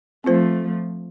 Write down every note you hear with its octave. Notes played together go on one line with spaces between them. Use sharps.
F3 A3 C4 F4 C5